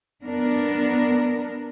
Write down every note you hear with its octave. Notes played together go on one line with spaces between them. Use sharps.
B3 D4 A#4